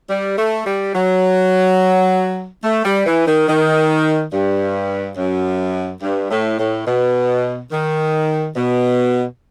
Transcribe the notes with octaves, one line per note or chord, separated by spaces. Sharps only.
G3
A3
G3
F#3
A3
G3
E3
D#3
D#3
G2
F#2
G2
A2
A2
B2
D#3
B2